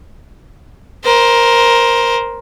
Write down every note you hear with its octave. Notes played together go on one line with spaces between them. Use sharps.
A#4 C5